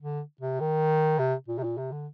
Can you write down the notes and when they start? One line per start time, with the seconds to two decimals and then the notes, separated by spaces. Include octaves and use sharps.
0.01 D3
0.41 C3
0.60 D#3
1.19 C3
1.48 A#2
1.58 C3
1.64 A#2
1.78 C3
1.92 D3